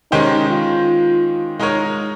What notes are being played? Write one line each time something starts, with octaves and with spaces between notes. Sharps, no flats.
D#3 G#3 C#4 D#4 G4 C5
F4
G#3 D#4 A#4 C#5